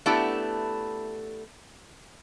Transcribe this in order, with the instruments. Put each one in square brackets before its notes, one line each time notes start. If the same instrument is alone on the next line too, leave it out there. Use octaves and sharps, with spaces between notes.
[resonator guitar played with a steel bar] A3 B3 D4 E4 G4 A4